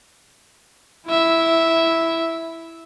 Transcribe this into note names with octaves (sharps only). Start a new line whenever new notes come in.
E4 E5